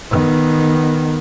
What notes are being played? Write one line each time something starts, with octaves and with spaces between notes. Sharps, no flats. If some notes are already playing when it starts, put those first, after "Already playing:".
D#3 B3